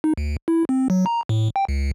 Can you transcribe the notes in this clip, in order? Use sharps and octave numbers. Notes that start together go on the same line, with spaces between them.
D#4
D2
E4
C4
F#3
A#5
A2
G5
C#2